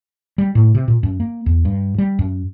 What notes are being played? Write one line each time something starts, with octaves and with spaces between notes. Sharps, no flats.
G3
A2
C3
A#2
F#2
A#3
E2
G2
G3
F#2